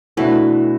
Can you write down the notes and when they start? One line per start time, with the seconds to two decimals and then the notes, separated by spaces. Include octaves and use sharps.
0.17 B2 E3 A3 D4 F#4